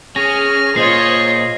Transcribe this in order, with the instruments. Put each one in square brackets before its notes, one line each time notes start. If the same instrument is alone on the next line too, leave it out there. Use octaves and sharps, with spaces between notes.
[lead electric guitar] C#4 [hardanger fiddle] G#4 [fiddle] F6 [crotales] A#6
[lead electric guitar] A#2 G#4 [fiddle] F4 C#5 [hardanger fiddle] C5 D#5 [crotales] C7